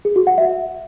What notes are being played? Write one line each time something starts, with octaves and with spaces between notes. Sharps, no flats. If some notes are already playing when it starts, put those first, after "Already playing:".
G#4
F#4
F#5
E5